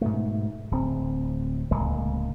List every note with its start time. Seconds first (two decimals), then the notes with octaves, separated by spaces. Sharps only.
0.01 G#2 B2 A3
0.71 D1 C4
1.71 D1 C#2 G#3 A#3